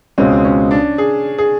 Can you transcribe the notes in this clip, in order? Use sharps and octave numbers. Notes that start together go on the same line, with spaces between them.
C#2 B2 G#3 C4 C#4
C#4
D4
G#4
G#4